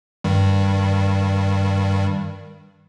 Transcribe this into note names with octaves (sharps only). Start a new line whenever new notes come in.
G2 D#3 G3